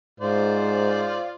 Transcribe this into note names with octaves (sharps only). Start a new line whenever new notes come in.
G#2 F4 C5 D5